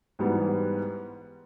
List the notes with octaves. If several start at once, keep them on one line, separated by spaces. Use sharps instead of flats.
G#2 E3 G3 B3